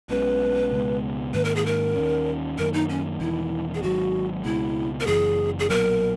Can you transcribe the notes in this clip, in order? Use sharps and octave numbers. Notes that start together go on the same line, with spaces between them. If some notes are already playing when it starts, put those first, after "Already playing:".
B1 B2 G#3 C#4 B4
C#2 B2 G#3 B3
G#2 D#3 A#3 B4
A#4
G#4
A#4
D#2 D#3 G#3 C#4
F#2 D#3 A#3 A#4
D#4
C#4
E1 E2 D#3 E4
G#4
G#1 G#2 D#3 F#3 F#4
C#2 B2 G#3 E4
A#4
F#1 F#2 E3 G#4
G#4
B1 A#2 F#3 B3 A#4